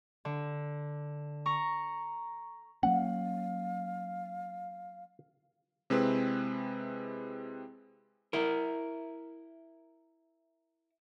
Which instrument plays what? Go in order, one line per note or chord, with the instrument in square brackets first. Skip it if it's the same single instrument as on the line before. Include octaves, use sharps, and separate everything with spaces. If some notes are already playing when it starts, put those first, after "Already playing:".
[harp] D3
A#5 C#6
[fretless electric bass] F#3 A#3 C#4 [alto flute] F5 [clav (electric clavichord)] F#5
[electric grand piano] C3 G#3 C4 E4 G#4 B4
[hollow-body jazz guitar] E4 A#4